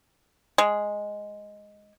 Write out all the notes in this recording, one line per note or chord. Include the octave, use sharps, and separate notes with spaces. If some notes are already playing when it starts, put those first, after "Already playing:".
G#3